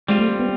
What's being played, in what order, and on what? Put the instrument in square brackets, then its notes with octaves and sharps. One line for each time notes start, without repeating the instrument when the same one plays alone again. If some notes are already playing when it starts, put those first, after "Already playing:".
[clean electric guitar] G3 C4 F4 [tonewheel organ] G#3
[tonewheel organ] A3
B3